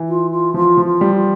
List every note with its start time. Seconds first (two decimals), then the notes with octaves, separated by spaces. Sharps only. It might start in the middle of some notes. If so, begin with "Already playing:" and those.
Already playing: E3
0.09 F4
0.31 F4
0.54 F3 F4
0.77 F3
0.86 F4
1.01 G3
1.16 F4